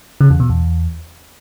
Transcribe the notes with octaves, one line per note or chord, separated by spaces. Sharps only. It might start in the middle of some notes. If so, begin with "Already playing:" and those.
C#3
E2
B2
E2